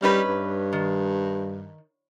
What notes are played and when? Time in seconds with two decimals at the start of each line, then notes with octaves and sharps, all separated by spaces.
0.02 G3 C#4 D#4 B4
0.28 G2
0.73 D#3